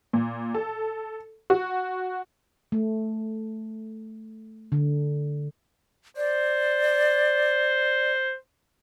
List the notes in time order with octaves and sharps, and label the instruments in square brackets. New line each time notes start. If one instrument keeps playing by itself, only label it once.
[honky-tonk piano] A#2
A4
F#4
[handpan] A3
D3
[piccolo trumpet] C5 [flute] D5